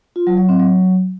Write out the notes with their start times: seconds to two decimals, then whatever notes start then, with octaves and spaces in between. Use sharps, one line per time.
0.16 F4
0.27 F#3
0.38 F#3
0.49 C4
0.60 F#3